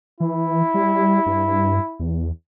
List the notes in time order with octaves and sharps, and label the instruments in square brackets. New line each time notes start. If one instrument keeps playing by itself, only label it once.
[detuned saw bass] E3 [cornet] E4
[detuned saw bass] G3
G2
E2